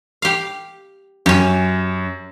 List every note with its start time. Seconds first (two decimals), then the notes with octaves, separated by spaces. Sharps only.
0.22 G4 F5
1.26 F#2 C#4 G4